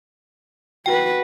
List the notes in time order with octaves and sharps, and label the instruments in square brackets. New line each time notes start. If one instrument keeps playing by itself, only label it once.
[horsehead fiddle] F#4 B4 [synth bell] G5